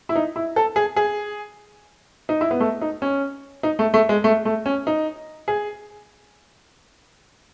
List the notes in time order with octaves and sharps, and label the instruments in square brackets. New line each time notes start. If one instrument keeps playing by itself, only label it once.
[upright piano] E4
D#4
E4
A4
G#4
G#4
D#4
E4
B3
A3
D#4
C#4
D#4
A3
A3
G#3
A3
A3
C#4
D#4
G#4